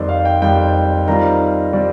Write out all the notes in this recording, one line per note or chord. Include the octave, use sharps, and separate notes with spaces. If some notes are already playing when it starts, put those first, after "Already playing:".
Already playing: F2 D#3 G3 C5 D5
F5
G5
F2 D#3 G3 G5
D#3 G3 C4 F4 A#5
D#3 G3 C4 D5